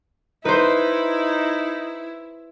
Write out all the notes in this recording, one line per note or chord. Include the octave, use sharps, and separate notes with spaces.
D#4 E4 B4 C5